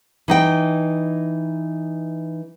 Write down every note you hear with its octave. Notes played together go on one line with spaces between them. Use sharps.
E3 D#4 G5